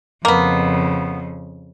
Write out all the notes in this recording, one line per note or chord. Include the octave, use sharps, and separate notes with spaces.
F2 C#3 A#3 B3